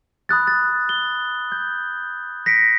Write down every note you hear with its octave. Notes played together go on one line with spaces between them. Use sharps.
B5 D#6 F#6 A6
A6
G7
G6
A#6 B6 C#7 D7